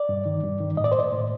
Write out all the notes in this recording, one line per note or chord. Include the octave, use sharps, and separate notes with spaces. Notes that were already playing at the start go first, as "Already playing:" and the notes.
Already playing: D5
G2
D#3
G2
D#3
A2 D#5
D5
C5
D5
A2